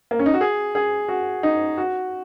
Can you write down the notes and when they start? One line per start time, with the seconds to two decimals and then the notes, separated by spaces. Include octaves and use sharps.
0.11 A#3
0.19 C#4
0.26 D#4
0.34 F#4
0.41 G#4
0.75 G#4
1.08 F#4
1.43 D#4
1.78 F#4